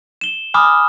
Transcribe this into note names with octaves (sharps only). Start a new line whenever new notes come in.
E7 G7
G#5 B5 D6 D#6 F6